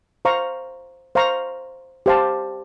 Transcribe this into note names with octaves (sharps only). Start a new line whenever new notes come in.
C5 F5 A#5 C#6
C5 F5 A#5 C#6
G4 C5 F5 A5